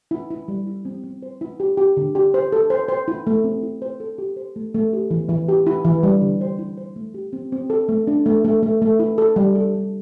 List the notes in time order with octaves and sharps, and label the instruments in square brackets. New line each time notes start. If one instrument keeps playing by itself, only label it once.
[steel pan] E4
E4
G3
E4
C4
C4
C5
E4
G4
G4
D3
G4
C5
A4
C5
C5
E4
A3
C4
E4
C5
A4
G4
C5
A3
A3
G4
E3
E3
G4
E4
E3
G3
D3
C5
E4
C5
A3
G4
C4
C4
A4
A3
D4
A3
A3
A3
A3
E4
A4
G3
A4
G3